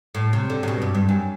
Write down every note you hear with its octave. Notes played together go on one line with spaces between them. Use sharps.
A2
C3
D3
C3
B2
G2
G2
F#2